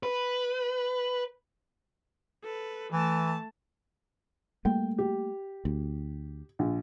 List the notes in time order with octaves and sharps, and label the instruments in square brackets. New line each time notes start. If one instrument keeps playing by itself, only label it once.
[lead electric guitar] B4
[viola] A4 B4
[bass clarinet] E3 [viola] A3 A5
[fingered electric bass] G3 A3 A#3 [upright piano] G5
[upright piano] G4
[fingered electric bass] D2
[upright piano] A#1